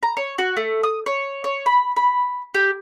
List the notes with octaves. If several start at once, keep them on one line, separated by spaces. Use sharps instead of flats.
A#5
C#5
F#4
A3
D#6
C#5
C#5
B5
B5
G4